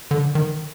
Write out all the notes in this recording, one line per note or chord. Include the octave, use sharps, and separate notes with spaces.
D3
D#3